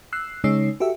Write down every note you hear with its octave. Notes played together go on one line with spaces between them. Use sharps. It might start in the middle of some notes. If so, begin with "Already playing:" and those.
E6 F#6 C7
C#3 G#3 D#4 C#5 E6 C7
F#4 G4 A4 E5